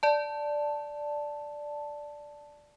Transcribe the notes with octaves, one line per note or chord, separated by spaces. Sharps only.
D5 A5